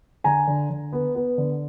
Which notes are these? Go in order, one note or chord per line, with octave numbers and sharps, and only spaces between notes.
D3 G#5 A#5
D3
D3
B3
B3
D3